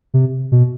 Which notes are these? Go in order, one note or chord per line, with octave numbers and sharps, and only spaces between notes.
C3
B2